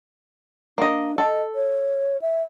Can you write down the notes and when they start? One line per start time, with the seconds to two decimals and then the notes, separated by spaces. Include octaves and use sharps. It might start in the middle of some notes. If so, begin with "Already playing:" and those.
0.78 A#3 D4 D#5
1.18 A4 D#5
1.55 C#5
2.21 E5